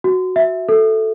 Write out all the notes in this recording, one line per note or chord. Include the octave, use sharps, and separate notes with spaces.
F#4
E5
A4